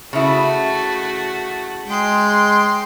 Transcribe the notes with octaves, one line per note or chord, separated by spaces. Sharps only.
C#3 A3 E4 F#4
G#3 G5 C6